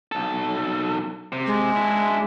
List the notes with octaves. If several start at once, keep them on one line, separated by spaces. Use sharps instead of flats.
B1 A4
C3
G#3
D4 E4